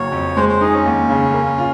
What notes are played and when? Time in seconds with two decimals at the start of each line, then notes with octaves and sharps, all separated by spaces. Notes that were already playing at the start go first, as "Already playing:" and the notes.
Already playing: F#1 F#3 C#5
0.12 F2
0.37 G#3 C5
0.49 C5
0.61 D#4 G#4
0.74 C#4
0.85 D#2
1.10 C#3
1.34 A#3
1.58 F4